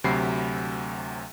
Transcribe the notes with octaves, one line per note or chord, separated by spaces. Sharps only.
D2 C3 F#3 B5 C7